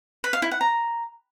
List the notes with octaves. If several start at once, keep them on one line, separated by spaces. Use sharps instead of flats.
B4
F5
E4
F#5
A#5